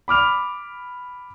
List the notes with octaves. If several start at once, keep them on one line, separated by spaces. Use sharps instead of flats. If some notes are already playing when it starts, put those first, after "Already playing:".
B5 D6 F6 F7